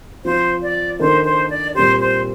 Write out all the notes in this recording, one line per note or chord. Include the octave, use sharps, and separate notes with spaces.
F3 C4 F4 C5
D5
D#3 A#3 D4 A4 C5
C5
D5
A#2 G3 C4 G4 C5
C5